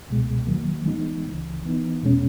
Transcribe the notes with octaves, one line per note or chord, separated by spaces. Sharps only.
C#2 B2 G#3
D#2 D#3 F#3 A#3
E3 G#3 B3 D#4
C#2 C#3 E3
E3 B3 D#4
E2 B2 G#3 C#4